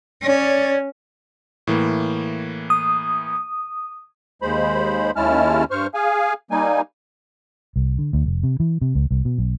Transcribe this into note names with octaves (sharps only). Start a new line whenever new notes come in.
C#4 C#5 D5
A2 E3 A#3
D#6
D#2 G#3 C5 B5
D#2 G#3 C#4 E4 A5 F6
G2 C5 C#6 F6
G#4 F5 G#5
G3 A#3 D#4 G#5
C2
D3
D2
F1
C3
E3
C3
C#2
C2
B2
B1